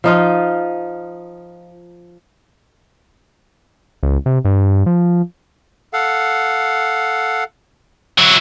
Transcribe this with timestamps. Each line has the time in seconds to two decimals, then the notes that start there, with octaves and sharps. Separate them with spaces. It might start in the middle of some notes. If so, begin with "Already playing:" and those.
0.04 F3 D#4 F4
4.03 C#2
4.26 C3
4.45 G2
4.86 F3
5.93 A4 F5 F#5
8.18 F#3 E4 F#4 C#6